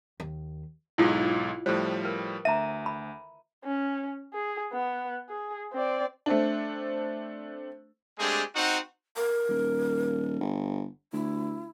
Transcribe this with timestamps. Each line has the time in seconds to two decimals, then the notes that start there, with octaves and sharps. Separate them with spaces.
0.20 D#2
0.98 B1 G#2 E4 F4 A4
1.66 A2 F3 G3 C5
2.05 A#4 B4
2.45 D2 E5 A#5 D#7
2.86 B5
3.64 C#4
4.33 G#4
4.73 B3
5.29 G#4
5.73 C4 D5
6.26 A3 C4 D4
8.19 G#3 A3 C4 D4 G4 G#4
8.56 C4 D#4 F#4 D#5 F#5
9.17 A#4
9.49 D#1
10.41 G1
11.13 D2 E4